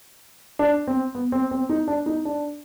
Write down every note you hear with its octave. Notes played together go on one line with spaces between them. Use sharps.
D4
C4
B3
C4
C4
D#4
D4
D#4
D4